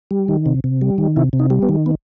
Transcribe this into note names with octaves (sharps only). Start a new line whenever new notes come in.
G3
D#3
C3
C3
G3
D#3
C3 E4
C3
D#4
G3
B3
D#3
B3